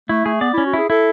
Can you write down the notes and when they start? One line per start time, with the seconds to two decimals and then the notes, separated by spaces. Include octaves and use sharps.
0.09 A3 E4
0.25 A3 G#4
0.41 B3 D5
0.53 C#4 E4
0.66 F#4
0.73 E4 G#4
0.90 E4 A4